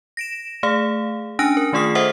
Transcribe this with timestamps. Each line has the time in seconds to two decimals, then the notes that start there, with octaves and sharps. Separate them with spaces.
0.17 A#6 D7 E7
0.63 A3 G#4 F5
1.39 C#4 D4 G#5 F#6 A#6 D7
1.57 A#4
1.73 D#3 A3 F4 G#4 D#6 C7
1.95 A4 C5 D#5 E5 F#5 D#6